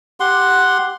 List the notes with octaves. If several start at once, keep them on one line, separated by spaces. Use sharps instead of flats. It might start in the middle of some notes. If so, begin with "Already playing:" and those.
G4 F#5 C6